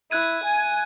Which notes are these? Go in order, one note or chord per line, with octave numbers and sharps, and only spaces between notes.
E4 F#6 G#6 D#7
G#5